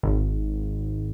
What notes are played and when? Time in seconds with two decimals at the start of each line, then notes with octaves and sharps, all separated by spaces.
0.03 G#1